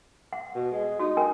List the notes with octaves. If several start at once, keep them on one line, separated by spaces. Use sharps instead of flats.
F#5
B2
G#3
D#4 F#4
C#4 A#4 G#5